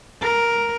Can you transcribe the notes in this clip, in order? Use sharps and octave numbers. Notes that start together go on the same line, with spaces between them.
A#4